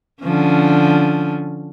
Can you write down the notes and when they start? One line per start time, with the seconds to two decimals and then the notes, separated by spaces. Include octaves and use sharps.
0.22 D3 F3 C#4